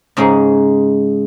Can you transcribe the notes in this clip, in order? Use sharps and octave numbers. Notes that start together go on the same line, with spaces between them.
G#2 C#3 G#3